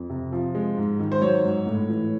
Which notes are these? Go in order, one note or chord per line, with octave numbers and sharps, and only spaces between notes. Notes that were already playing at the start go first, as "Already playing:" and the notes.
Already playing: F2
C3
F3
G#3
G#2
D#3
C5
F#3 C#5
G#2
A2
E3